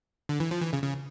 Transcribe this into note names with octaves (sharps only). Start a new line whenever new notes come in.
D3
E3
F3
E3
C#3
C#3